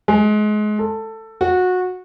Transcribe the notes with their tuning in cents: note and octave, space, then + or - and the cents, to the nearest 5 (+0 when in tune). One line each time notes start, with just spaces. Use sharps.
G#3 +30
A4 +15
F#4 -20